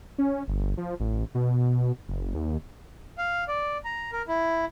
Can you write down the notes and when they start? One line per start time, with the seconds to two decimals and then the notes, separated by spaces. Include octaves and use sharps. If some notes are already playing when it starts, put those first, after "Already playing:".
0.18 C#4
0.48 G1
0.77 F3
1.00 A1
1.35 B2
2.08 F#1
2.35 D#2
3.18 F5
3.48 D5
3.85 A#5
4.12 A#4
4.28 E4